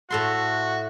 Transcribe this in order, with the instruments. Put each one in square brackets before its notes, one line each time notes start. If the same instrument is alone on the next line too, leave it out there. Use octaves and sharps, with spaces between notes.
[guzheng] A2 A4 C6 [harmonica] F#4